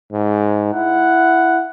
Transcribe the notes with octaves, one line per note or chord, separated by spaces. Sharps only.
G#2
E4 F#5